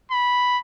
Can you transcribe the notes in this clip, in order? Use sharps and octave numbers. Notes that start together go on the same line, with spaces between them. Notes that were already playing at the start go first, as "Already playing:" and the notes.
B5